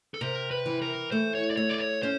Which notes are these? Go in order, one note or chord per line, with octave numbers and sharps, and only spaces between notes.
A4
C3 A#4
B4
E3
A#4
A3 C5
C#5
D5
A3 C#5
D5
C#5
C#4 C5